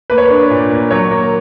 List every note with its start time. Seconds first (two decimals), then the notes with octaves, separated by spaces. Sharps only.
0.10 A#3 B4
0.18 C#5
0.26 D4 B4
0.51 A#2
0.71 A#3
0.91 F#3 C#5
1.11 A#3